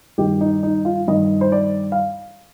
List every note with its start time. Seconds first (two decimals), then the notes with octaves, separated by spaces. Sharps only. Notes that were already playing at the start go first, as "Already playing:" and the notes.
0.18 G2 D#3 G4
0.41 D#4
0.63 D#4
0.85 F4
1.08 G2 D#3 D#5
1.41 C5
1.52 D5
1.92 F5